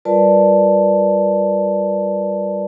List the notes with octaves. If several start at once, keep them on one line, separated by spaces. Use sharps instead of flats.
G3 F4 A#4 B4 D5 A5